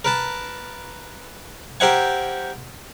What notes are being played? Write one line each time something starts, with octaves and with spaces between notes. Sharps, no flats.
A#4 B4 A5
G4 A#4 C5 E5 F#5 G#5